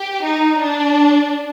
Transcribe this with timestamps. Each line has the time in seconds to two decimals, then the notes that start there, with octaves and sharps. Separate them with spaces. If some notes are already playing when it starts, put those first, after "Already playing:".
Already playing: G4
0.24 D#4
0.60 D4